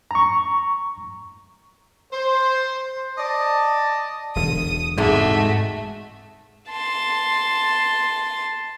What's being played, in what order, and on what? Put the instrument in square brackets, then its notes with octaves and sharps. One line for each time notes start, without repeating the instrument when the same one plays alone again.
[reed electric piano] A#5 C#6
[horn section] C5
D5 D#5 A5
[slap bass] E1 D3 [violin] D#6
[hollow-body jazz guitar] G#2 C3 G#3 [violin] A3 F#4
[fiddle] A5 C6